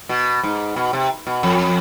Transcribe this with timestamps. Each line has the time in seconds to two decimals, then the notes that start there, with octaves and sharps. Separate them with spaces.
0.09 B2
0.43 G#2
0.76 B2
0.93 C3
1.27 B2
1.43 F2